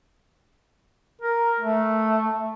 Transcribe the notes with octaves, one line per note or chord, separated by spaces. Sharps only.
A#4
A3